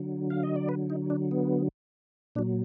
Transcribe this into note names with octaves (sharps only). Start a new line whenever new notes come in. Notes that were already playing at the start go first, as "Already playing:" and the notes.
Already playing: D3 F#3
F5
D#5
D5
B4
D#4
D4
B3
A#2 F#3 D4